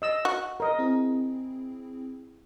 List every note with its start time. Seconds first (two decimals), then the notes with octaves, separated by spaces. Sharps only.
0.02 D#5 E6
0.25 F#4
0.60 A#4 D#5
0.79 C4 E4 G#4